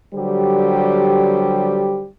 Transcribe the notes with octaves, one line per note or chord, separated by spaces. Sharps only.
D3 F#3 G3 G4 C5